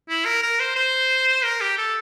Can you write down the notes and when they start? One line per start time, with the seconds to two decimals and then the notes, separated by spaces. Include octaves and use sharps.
0.09 E4
0.26 A#4
0.43 A#4
0.60 C5
0.76 C5
1.44 A#4
1.61 G4
1.78 A4